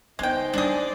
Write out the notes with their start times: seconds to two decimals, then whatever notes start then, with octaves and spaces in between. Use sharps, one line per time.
0.19 C#3 G#3 B3 D#4 C5 G5
0.54 G3 A#3 D4 G#4 D5